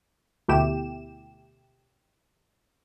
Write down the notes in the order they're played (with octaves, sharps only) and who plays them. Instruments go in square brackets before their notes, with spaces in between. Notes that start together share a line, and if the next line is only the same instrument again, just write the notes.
[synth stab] D2 B2 A3 E4 G4 E7